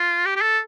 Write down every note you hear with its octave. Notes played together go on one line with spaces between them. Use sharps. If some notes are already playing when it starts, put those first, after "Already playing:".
Already playing: F4
G4
G4
A4